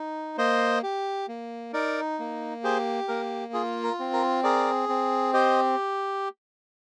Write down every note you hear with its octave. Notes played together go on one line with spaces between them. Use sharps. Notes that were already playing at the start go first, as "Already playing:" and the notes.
Already playing: D#4
A#3 C5 D#5
G4
A#3
D#4 A#4 D5
A#3
G4 G#4 C5
A#3 A#4
F4 G#4
A#4
C4
A#4
G#4 A#4 D5
C4
G4 C5 D#5